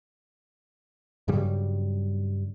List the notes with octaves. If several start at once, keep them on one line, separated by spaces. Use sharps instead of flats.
G2 C#3 F#3 G3